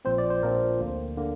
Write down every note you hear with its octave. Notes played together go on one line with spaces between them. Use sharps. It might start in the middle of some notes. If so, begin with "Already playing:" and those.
A#1 A#2 F3 C4 C5
D5
C5
A#1 A#2 F3 C4 A#4
D2 D3 A#3
D3 A#3